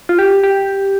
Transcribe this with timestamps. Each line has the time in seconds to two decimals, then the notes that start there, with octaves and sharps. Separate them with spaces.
0.09 F4
0.19 G4
0.44 G4